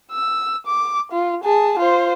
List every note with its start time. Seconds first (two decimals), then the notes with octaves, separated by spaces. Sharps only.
0.12 E6
0.67 D6
1.12 F4
1.44 G#4 A5
1.79 F4 C5